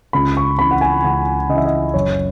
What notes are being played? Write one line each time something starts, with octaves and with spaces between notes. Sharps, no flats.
C#2 B5
C#6
C#3 E3 B5
F#5
G#5
C#2 F#5
C#3 E3 D#5 E5
D#5
F#1 C#5